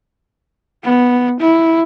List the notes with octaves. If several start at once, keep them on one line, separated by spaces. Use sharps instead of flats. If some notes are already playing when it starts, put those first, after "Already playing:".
B3
E4